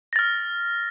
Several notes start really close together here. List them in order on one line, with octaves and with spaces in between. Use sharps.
A#6 A6 F6